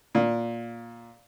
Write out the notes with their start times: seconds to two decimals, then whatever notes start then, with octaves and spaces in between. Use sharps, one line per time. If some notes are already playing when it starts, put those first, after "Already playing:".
0.15 A#2